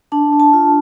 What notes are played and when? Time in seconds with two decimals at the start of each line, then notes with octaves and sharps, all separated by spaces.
0.12 D4 A5
0.32 D4
0.40 A5
0.53 F4